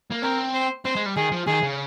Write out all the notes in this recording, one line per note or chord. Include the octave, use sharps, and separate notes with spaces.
A#3
C4 A#4
C5
C4 C5
G#3
G3
D#3 G#4
F3
D#3 G#4
C#3